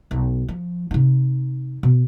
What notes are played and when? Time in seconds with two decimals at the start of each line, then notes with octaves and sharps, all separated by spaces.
0.11 B1
0.48 F3
0.91 C3 D#4
1.83 B2